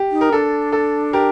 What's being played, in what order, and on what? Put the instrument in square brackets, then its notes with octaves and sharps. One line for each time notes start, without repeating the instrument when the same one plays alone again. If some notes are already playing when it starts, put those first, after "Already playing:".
Already playing: [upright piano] G4
[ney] D#4
[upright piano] A#4
[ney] D4 [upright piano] A4
[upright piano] A4
G4 A#4